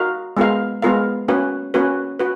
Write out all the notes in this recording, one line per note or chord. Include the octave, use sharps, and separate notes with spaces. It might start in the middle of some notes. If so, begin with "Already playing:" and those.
Already playing: D#4 F#4 A#4 F5
G#3 B3 F4 A#4 F5
G#3 B3 F4 A#4 F5
A#3 C#4 F#4 B4
A#3 C#4 F#4 B4
F#4 B4